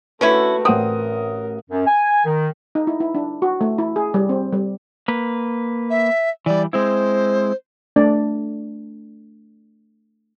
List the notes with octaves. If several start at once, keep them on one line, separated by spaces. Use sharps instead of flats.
D3 A3 C#4 E4 F#4 B4
A1 C4 A#4 F#5 D#6
F#2
G#5
D#3
D#4
E4
E4
D4
F#4
A3
E4
G#4
G3
C4
G3
A#3 B4
E5
E3 G3 D5
G#3 C4 E4 C5
A3 D4 D5